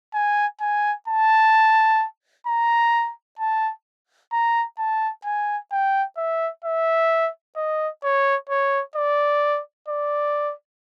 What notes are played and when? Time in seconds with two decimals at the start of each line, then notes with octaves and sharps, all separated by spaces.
0.14 G#5
0.61 G#5
1.08 A5
2.47 A#5
3.39 A5
4.32 A#5
4.78 A5
5.25 G#5
5.72 G5
6.17 E5
6.65 E5
7.56 D#5
8.04 C#5
8.49 C#5
8.96 D5
9.88 D5